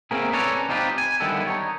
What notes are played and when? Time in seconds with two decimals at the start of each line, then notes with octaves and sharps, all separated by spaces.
0.11 A#3 C4 C#4 E4 G#4 A#4
0.33 C#4 A4 B4 C#5 D5 A#5
0.69 C4 D#4 F4 G4 A4 B4
0.98 G#5
1.20 D3 D#3 G3 B3 E4 A4
1.47 D#4 C#5